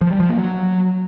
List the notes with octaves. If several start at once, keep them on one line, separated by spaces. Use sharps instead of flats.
F3
G3
F3
A#3
F#3